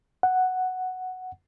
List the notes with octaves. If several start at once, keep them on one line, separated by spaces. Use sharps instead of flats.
F#5